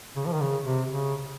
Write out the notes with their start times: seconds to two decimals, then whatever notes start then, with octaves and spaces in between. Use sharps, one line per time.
0.16 C#3
0.26 F3
0.33 D#3
0.41 C#3
0.64 C3
0.88 C#3